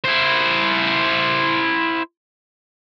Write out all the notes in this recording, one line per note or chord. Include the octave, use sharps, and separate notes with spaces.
E4 C5